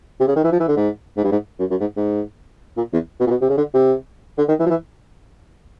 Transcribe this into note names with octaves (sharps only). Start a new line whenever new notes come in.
C3
C#3
D#3
E3
F3
E3
D3
G#2
G#2
G2
G#2
F#2
F#2
G#2
G#2
A#2
E2
B2
A#2
B2
C3
C#3
D3
C3
D3
D#3
E3
F3
E3